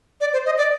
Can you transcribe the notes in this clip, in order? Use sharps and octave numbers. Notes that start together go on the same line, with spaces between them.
D5
C5
D#5
D5